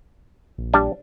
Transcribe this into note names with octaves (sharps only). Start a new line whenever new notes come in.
A#1
G3 D4